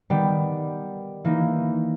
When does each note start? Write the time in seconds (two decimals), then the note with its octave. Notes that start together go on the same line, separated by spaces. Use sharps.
0.10 D#3 G3 B3 G4
1.24 E3 A#3 D#4